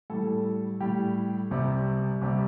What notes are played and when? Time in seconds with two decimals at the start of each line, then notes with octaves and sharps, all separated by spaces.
0.10 A2 G3 A4
0.81 A2 G3 G4
1.51 C2 C3 G3
2.22 C2 C3 G3